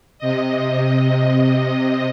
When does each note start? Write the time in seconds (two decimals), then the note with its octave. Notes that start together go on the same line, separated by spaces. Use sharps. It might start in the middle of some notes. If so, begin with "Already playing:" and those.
0.19 C3 D#5